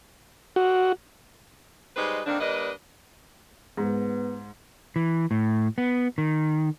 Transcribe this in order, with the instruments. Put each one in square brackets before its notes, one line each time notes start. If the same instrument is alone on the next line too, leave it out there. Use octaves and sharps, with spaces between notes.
[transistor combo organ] F#4
[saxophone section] G3 G#3 D#4 B4 C5 D#5
D3 D#3 A#3 C4 D4
G3 A#3 D4 B4 D#5
[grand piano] G#2 [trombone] B3
[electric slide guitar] E3
A2
B3
D#3